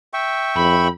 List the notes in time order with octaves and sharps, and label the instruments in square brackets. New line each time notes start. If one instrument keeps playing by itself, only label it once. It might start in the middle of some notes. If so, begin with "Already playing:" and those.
[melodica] E5 G5 C#6
[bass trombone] F2 [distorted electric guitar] B5